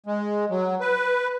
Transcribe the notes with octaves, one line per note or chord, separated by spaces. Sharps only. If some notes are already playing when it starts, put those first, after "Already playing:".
G#3
F#3
B4